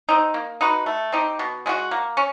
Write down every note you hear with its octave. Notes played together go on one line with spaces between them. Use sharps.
C4 D#4
A#3
D#4 F#4 B4
A3
C4 D#4 G4
B2
G#3 C#4 F#4
A#3
C#4